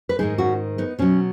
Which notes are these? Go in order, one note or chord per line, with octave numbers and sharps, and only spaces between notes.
B4
G#2 D#3 G#3 D#4 G#4
C#4 F#4
B3 D#4
B2 F#3 C#4